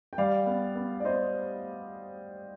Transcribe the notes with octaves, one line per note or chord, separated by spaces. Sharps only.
G5
G3 D5 F5
B3
B3
D5
B3 C5 D#5